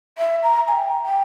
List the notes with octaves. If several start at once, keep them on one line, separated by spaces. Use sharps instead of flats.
E5
A#5
G#5
G5
G5